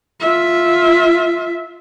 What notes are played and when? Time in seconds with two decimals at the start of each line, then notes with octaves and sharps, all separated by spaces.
0.20 F4 E5